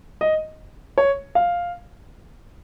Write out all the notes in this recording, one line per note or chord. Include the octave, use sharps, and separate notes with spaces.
D#5
C#5
F5